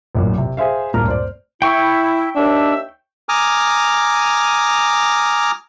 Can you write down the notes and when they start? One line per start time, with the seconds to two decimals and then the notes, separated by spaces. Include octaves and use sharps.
0.15 A1 F#2 A#2
0.38 C3
0.57 G#4 C5 E5 F5
0.94 D1 G2 A#2 A#4 A#5 F6
1.08 C5 D5
1.62 E4 G5 C#6
2.36 D#2 D4 E5 E6
3.29 G#5 A#5 D6 D#6 F6